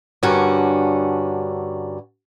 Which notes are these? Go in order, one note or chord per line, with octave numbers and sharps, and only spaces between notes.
G2 D3 C#4 F#4 A#4